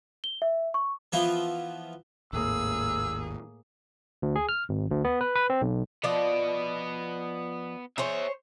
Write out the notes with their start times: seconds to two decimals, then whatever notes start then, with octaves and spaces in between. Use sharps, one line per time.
0.24 G7
0.42 E5
0.74 C#6
1.12 E3 F3 B3 E4 F4
2.33 G#1 D#2 A2 A#3 G#4 E6
4.22 D2
4.36 G#4
4.49 F6
4.69 G#1
4.90 D2
5.05 B3
5.21 B4
5.35 B4
5.50 C4
5.61 B1
6.04 F3 B3 D5 D#5
7.98 G#4 C5 C#5 E5